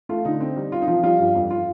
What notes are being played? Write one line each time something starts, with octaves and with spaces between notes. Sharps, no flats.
A3 F4
D3 D#4
C4
G3
C4 F4
D#4
F3 F4
G3 F4
G2
F2
F4